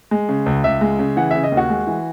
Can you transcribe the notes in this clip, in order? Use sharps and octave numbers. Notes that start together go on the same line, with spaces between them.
G#3
C#3
C#2
C#2 E5
G#3
C#3
E3 F#5
C#3 E5
D#5
D#2
F#4
G#3
E3